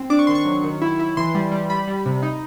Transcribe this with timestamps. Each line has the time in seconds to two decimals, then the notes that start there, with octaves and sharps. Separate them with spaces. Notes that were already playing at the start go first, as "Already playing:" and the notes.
Already playing: C4
0.10 D4 D6
0.19 C#6
0.27 D#3 C6
0.35 C#6
0.45 F#3
0.64 D#3
0.82 E4
0.99 E4
1.17 E3 C6
1.35 G3
1.52 G3
1.70 G3 B5
1.88 G3
2.06 C3
2.23 D#4